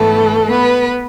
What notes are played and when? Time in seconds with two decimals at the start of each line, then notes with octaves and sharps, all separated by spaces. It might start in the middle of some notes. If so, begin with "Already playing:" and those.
Already playing: G#2 E3 G#3 A3 B3 A4
0.49 B3 B4